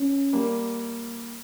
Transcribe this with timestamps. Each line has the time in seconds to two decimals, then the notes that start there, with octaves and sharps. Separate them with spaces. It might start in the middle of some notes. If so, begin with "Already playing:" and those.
Already playing: C#4
0.33 G3 A#3